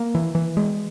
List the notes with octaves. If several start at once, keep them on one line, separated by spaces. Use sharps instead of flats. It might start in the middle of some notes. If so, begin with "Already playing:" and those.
Already playing: A#3
E3
E3
G#3